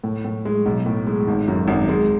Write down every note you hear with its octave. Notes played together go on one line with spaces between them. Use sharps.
A2
A2
G#3
B1
A2
G#3
G#1
F#2
G#1
G#3